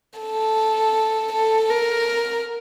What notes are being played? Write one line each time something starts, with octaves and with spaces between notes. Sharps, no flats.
A4
A4
A#4